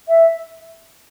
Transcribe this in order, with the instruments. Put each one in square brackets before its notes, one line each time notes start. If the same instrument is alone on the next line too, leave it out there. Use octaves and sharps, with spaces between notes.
[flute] E5